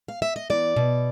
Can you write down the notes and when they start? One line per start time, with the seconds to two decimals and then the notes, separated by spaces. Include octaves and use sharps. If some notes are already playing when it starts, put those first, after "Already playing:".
0.08 F5
0.22 E5
0.36 D#5
0.50 E2 D5
0.76 B2